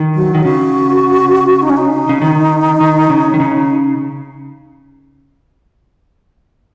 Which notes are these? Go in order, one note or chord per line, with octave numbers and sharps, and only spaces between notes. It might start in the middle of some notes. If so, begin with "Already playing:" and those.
Already playing: D#3
F#3
D#3
C#3 F#4
D#4
C#4
D#4
C#3
D#3
D#3
C#3
D#3
C#3